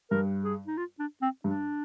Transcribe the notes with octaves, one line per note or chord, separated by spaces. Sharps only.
G2 A#4
G#4
D#4
F4
D4
C4
G2 D4